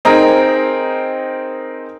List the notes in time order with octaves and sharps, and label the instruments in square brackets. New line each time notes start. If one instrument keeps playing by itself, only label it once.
[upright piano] C4 D#4 G#4 A#4